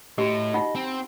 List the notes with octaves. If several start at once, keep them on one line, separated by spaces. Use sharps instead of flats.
A2 F#4 G4 D#5
D#4 F4 F#5
C4